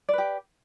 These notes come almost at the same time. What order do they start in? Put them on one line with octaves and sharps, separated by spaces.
D5 B4 G4